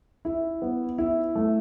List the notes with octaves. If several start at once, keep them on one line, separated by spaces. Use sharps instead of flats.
E4
B3
E4
A3